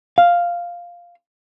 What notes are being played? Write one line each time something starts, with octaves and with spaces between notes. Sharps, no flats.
F5